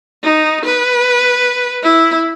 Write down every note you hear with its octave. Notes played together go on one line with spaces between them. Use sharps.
D#4
B4
E4